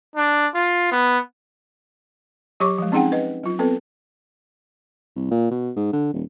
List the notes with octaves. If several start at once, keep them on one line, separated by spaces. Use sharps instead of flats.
D4
F4
B3
F#3 G4 C#5 C#6 D6
F3 G#3
C4 C#4 D#4 G#4 F#5 G5
B4 D#5
F#3 F4
B3 C4 A4 B4
C2
A#2
B2
G#2
D3
D#1